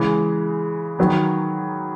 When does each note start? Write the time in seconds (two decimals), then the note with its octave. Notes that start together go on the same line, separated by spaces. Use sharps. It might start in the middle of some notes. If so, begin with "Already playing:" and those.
Already playing: C#3 E3 G#3
0.99 D#3 F#3 B3